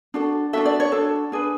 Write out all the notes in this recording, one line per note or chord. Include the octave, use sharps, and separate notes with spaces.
D4 F#4 A4
D4 F#4 A4 E5
D5
C#5
D4 F#4 A4
D4 G#4 B4